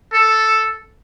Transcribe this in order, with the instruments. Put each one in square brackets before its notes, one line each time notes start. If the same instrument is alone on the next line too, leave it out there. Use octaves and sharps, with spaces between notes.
[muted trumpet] A4